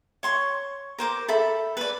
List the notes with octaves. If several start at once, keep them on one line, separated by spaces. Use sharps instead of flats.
C#5 C6 C#6
A#4 C5 D6
A4 E5 B5
B4 D5